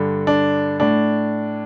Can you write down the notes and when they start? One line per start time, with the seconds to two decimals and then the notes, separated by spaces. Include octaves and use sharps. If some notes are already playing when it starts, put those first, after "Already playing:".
Already playing: G2 D3
0.27 D4
0.80 A2 D4